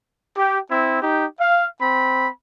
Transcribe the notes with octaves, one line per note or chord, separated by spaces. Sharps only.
G4
C4 E4
D#4 G4
F5
C4 B5